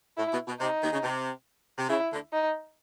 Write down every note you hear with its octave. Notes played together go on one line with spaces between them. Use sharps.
A2 E4
B2
B2
C3 D#4
D#2 D#3
C#3
C3
C3
C#3 E4
D2 D3
D#4